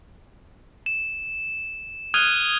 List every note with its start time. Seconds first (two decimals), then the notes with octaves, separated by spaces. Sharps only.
0.86 E7
2.14 D#6 F6 F#6 G#6 D#7 G7